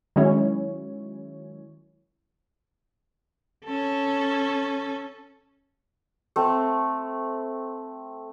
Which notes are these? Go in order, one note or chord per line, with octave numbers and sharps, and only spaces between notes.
D#3 F#3 G#3 C#4 E4 C#5
C#4 A4
A3 C4